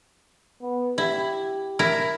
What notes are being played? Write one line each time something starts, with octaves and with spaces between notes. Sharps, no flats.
B3
E4 G4
E4 A#4